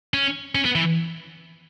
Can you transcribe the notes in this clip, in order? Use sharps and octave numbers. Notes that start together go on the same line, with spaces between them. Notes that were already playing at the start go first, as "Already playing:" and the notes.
C#4
C#4
B3
E3